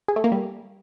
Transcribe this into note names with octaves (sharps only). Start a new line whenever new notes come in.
G#4
A3
A#3
G3